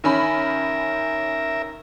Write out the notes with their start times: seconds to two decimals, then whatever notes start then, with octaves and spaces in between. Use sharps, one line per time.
0.04 D#3 C#4 A#4 E5 B5